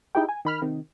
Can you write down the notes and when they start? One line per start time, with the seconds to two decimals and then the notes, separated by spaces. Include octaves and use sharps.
0.15 D#4 E4 G4 G#4 G5
0.29 G#5
0.45 D#3 B5 F6
0.62 C3 D#3